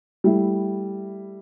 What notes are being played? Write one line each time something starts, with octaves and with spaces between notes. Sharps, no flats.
G3 A3 E4